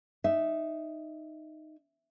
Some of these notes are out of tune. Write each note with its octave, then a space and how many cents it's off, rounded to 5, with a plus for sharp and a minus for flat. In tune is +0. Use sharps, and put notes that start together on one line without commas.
D#4 -10 E5 +0